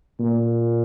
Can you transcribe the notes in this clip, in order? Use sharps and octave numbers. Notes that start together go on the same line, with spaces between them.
A#2